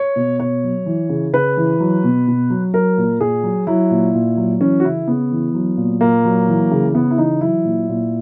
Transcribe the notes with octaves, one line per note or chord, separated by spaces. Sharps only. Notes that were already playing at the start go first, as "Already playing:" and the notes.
Already playing: C#5
B2
B2 C#5
F#3
E3
C#3
C#3 B4
E3
F#3
B2
B2
F#3
F#3 A#4
A#2
A#2 G#4
F#3
F#3 E4
A#2
A#2
F#3
E3 C#4
F#4
C#3 E4
C#3 B3
E3
F#3
A#2
A#2 A#3
F#3
E3
C#3
C#3 B3
E4
E3 D#4
F#3 E4
A#2
A#2